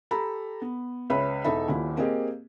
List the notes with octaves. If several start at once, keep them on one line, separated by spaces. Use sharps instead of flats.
G4 A4 A#5 B5
B3
C#2 B4 C#5 E5 B5
E1 D#4 A4 D#5 E5 B5
D#1 A#2 E4
A#3 C4 G4 G#4 D#5